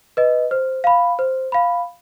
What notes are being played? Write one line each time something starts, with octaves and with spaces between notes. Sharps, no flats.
B4 D#5
C5
F5 B5
C5
F5 B5